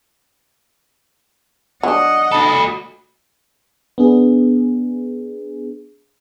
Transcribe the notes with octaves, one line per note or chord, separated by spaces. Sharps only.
F#3 D4 D#5 F#5
F#4 A4 B5
B3 D4 G#4